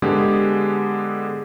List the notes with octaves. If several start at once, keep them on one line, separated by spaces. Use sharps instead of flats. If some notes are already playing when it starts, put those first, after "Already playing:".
D3 G#3 B3 G4 G#4